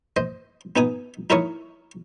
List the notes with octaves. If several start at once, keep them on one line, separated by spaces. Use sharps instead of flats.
C5 D#5
B3 D#4 G#5 D#6
D#4 E4 A#4 C#5 C#6 D#6